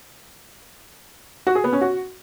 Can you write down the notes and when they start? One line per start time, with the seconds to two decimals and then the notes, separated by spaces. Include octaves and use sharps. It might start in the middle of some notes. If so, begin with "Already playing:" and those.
1.47 F#4
1.55 G#4
1.64 B3
1.73 C#4
1.81 F#4